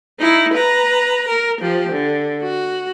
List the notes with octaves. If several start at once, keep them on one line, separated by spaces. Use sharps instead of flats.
D#4 E4
B4 A#5
A#4
F3 G4
D3
F#4